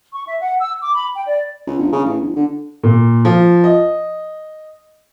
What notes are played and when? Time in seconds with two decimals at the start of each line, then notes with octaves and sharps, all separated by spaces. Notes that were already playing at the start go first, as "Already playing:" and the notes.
0.14 C#6
0.27 E5
0.40 F#5
0.61 E6
0.82 D6
0.94 B5
1.15 G5
1.27 D5
1.67 C#2
1.79 G1
1.92 C#3
2.04 A1
2.21 G1
2.36 D3
2.83 A#2
3.25 F3
3.64 D#5